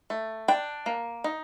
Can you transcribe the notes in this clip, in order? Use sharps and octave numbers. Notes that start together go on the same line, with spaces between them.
A3
D4 G5
A#3
D#4